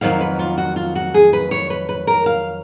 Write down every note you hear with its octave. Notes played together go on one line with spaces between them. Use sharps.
F2 D#3 F#3 F5
B4
F4
F#4
F4
F#4
G#4
B4
C#5
B4
B4
A#4
F5